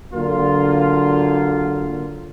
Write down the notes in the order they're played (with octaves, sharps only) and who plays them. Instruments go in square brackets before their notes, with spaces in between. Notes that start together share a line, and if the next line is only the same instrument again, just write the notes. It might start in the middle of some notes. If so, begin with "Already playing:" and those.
[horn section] D3 F#3 A#3 F4